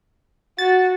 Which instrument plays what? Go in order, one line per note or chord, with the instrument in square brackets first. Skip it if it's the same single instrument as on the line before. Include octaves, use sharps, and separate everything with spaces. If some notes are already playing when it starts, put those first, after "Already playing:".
[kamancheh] F#4 [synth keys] A6